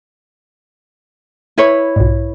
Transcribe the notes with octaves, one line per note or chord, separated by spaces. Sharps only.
E4 B4 C#5
B1 G#2